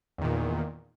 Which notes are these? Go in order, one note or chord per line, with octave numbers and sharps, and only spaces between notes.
E2 A#2 D#3